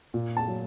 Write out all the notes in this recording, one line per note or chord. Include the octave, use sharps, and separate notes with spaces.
A#2
A5
F#3